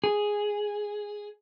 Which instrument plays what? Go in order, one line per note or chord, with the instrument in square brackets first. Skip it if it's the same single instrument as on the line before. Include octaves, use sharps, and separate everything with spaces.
[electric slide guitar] G#4